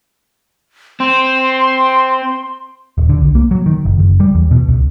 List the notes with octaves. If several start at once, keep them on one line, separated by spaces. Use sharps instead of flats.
C4 C6
D#1
D3
C2
A#3
F#3
D#3
F#1
F#1
G3
E2
B2
C#2